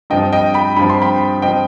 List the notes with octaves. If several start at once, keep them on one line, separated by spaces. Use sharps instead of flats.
G2 F3 C4 D#5 G5
D#5 G5
G5 B5
G2 F3 C4 B5
C6
G5 B5
F3 C4 D#5 G5